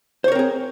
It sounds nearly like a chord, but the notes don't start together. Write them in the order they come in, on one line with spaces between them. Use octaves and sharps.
C5 C#5 A#4 C4 G#4